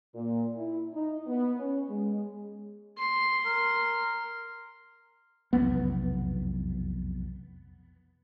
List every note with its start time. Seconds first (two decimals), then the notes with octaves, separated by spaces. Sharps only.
0.14 A#2
0.55 E4
0.94 D#4
1.26 B3
1.58 C#4
1.90 G#3
2.98 C6
3.45 A#4
5.53 F1 B1 E2 B3